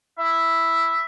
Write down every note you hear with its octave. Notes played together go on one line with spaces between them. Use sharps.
E4 E5